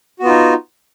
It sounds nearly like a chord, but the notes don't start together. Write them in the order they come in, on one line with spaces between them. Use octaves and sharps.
F#4 B3 F4 D#4